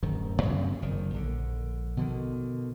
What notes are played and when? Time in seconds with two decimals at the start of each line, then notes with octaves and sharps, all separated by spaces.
0.03 D1 F#2 D#3
0.43 F#2 C#3 C4
0.82 F#1 D#3
1.14 A#1 D3
1.97 B2 D3 D#3